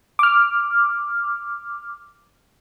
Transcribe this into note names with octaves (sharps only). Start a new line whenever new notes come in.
D6 F6